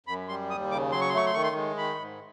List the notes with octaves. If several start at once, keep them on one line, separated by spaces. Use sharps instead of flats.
F#2 B5
G3 C6
D#2 D#6
C#3 D6
F#3 C6
C#6
C6
A3 C#6
C6
D#3 C#6
C6
G#3
D#3 B5
G#2